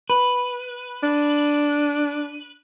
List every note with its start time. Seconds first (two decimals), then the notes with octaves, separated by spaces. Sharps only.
0.10 B4
1.03 D4